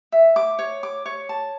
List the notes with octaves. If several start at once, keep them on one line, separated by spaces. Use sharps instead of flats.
E5
D6
C#5
D6
C#5
A5